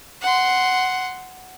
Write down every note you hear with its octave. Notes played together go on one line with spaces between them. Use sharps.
F#5 C6